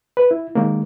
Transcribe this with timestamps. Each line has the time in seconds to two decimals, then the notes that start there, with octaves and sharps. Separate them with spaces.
0.17 B4
0.31 E4
0.55 D#3 G#3 A#3